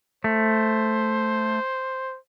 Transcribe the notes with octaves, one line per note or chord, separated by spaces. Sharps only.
A3 C5